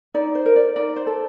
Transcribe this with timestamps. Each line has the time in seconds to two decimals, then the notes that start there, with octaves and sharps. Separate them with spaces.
0.14 D#4 D5
0.35 C5
0.46 A#4
0.56 D5
0.76 D#4 D5
0.96 C5
1.07 A4